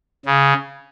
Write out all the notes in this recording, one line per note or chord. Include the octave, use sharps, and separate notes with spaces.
C#3